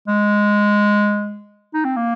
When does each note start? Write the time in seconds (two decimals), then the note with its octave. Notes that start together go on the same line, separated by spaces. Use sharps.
0.08 G#3
1.74 D#4
1.85 C4
1.96 A#3